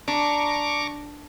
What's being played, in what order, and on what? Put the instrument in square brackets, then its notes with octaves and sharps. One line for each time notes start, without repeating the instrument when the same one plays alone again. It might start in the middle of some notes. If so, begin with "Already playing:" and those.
[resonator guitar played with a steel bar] D4 [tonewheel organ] A#5 C#6 D6